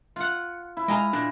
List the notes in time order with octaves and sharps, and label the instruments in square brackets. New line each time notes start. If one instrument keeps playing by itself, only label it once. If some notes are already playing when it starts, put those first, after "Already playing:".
[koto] F4 F#5
[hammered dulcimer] E4
[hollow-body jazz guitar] G#3 G#5 A#5 [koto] D#5 F5
[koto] A#2 [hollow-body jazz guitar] D4